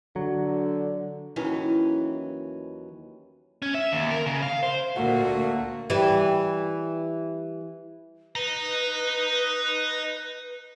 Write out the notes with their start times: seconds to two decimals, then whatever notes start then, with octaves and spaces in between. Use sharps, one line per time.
0.16 D3 F#3
1.36 D#2 E3 F#3 C#4
3.62 C#4
3.74 E5
3.92 D#2
4.11 A#4
4.26 C#3
4.43 F5
4.63 C5
4.96 D2 A#2 A3 A#3 F#4 F#5
5.90 E3 G3
8.35 B4 D#5 A#5